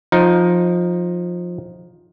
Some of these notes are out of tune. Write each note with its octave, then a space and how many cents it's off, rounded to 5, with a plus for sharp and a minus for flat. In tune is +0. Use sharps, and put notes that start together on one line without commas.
F3 +15 D#4 +0